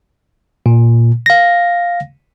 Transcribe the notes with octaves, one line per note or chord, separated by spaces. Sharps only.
A#2
F5 A#6